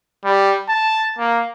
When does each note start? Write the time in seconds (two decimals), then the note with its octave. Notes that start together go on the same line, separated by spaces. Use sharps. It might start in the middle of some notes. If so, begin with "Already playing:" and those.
0.24 G3
0.69 A5
1.19 A#3